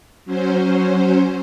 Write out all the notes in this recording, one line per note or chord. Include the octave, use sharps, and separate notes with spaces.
F#3 C#4 C5